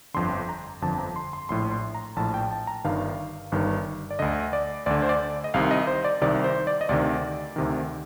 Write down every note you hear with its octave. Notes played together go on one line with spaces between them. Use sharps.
G1 F2 D3 C6
A#5
G1 F2 D3 A5
A#5
C6
C6
A#1 A2 C6
C6
A#5
A#1 A2 A5
G5
A5
A#5
G1 G2 D#3 F5
G1 G2 D#3
D5
D2 D3 D#5
D5
D2 D3 D5
C5
D5
D#5
C2 C3 D#3 F5
D#5
C5
D5
C2 C3 D#3 D5
C5
D5
D#5
D2 C3 D#3 D5
D2 C3 D#3